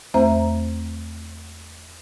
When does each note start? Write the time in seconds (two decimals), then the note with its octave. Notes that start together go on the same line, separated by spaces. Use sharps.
0.14 E2 A3 C4 C5 E5 A#5